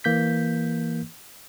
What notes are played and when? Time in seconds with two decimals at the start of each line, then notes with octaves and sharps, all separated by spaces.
0.04 E3 A#3 G6 B6